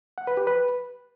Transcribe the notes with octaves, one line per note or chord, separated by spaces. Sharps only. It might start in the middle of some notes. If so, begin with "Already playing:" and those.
F#5
B4
G4
B4